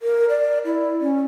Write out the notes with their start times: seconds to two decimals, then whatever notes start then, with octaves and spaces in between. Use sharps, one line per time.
0.02 A#4
0.29 D5
0.65 E4
1.01 C#4